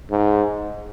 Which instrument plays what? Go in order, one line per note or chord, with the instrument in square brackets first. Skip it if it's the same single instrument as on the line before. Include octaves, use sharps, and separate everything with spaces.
[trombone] G#2